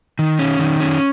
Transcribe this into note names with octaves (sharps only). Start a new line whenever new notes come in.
D#3
C#4
D#3
C#4